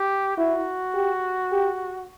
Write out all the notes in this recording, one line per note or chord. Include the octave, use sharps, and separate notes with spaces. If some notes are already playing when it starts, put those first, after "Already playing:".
Already playing: G4
E4 F#4
G4
G4